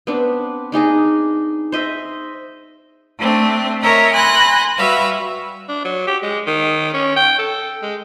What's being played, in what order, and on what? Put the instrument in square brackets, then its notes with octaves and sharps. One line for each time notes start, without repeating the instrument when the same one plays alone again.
[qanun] B3 C4 D4
D4 D#4 G#4 D#5
C5 D#5 E5
[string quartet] A3 C4 D4
A#4 C#5 D#5 E5 A#5
G#5 B5 C6 F#6 A#6
G3 F#4 B4 E5 F5
[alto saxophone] D4
F#3
G4
G#3
D#3
C#4
G5
A4
G#3